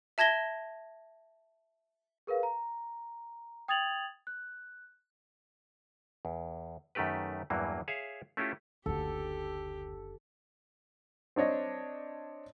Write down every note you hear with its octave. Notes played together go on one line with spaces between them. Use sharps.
E5 A5 G#6 A#6 G7
G#4 A#4 B4 F5
A#5
G5 D#6 G#6 A6 F7 F#7
F#6
E2
F#2 D#3 A3 G4 B4
E2 G2 E3 F#3 A#3
G#4 C#5 E5 F5
A3 C#4 E4 F4 G4
F#1 D2 D3 G4 A4
C4 D4 C#5 D#5